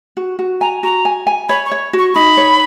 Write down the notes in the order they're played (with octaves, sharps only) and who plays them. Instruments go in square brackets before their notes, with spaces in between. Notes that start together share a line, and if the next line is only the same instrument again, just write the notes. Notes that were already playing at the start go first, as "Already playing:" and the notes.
[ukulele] F#4
F#4
[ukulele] G#5 [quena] A#5
[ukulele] F#4 [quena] A#5
[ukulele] G#5
G#5
[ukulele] C#5 [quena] B5
[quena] C#6
[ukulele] C#5
F#4
[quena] C#6
[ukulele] D#4 [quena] B5
[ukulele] C#5